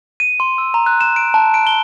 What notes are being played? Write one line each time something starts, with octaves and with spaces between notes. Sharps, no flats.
D#7
C6
E6
A#5
F#6
E7
D7
A5
D7
G7